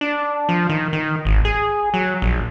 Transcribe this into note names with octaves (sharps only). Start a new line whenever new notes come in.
D4
F3
D#3
D#3
G#1
G#4
F#3
A#1